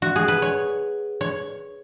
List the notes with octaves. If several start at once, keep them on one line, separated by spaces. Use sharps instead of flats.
F#4
G#4
B4
C#5
C#5